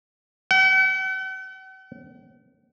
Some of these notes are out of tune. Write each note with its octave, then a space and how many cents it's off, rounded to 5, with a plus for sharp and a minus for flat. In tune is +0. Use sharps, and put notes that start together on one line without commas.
F#5 +45